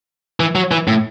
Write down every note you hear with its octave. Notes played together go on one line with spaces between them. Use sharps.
E3
F#3
E3
A2